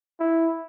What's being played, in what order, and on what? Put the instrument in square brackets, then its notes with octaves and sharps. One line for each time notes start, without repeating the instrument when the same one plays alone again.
[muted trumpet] E4